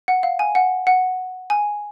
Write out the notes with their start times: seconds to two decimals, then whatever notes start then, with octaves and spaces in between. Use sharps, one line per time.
0.08 F#5
0.23 F5
0.39 G#5
0.55 F#5
0.87 F#5
1.50 G#5